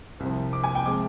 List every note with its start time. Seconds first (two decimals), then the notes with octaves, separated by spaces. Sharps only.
0.20 C2 C3 F3
0.53 D6
0.64 G#5
0.75 G5
0.86 C3 F3 G#3 D6